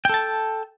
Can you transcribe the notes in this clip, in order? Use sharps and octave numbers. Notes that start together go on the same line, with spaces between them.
A4 G5 A5